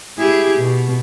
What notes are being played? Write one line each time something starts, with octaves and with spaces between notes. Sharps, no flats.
E4 G4 G#4
B2